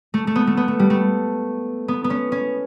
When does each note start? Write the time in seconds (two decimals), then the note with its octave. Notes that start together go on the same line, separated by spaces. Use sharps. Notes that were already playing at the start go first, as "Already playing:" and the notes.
0.14 A3
0.27 A3
0.36 B3
0.47 A3
0.57 B3
0.68 A3
0.79 G3
0.90 A3
1.88 B3
2.04 B3
2.10 C#4
2.32 C#4